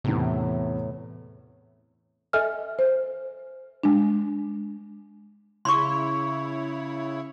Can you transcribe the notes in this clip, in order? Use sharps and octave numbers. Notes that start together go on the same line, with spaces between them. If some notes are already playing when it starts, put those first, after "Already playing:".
E2 A2 C3
A4 D#5 E5 G#5 F6
C5
G#3 D4
C#3 E4 C#5 C6 C#6